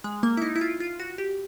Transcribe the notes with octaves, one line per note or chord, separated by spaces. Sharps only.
G#3
A#3
E4
D#4
E4
F4
F4
F#4
G4